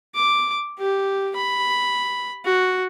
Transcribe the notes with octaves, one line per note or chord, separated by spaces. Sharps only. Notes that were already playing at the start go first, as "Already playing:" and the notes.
D6
G4
B5
F#4